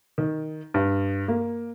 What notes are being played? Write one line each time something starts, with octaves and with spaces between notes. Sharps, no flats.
D#3
G2
A#3